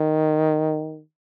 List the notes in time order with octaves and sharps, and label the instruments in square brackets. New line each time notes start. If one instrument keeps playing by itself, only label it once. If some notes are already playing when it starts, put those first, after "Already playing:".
Already playing: [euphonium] D#3